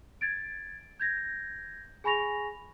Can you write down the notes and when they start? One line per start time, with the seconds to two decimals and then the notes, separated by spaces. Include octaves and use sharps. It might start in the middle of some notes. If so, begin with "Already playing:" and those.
0.21 G#6 A6 D7
1.00 G6 G#6 A#6
2.04 G#4 G#5 B5 C#6 A#6 F7